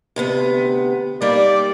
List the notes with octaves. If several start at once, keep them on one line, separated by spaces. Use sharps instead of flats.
D2 C3 B3
G3 A#3 D#4 D5